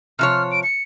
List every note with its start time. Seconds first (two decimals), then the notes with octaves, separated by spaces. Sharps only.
0.19 C3 F3 C#5 F6
0.51 D7
0.63 C#7